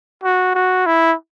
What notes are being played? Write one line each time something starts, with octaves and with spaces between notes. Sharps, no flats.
F#4
F#4
E4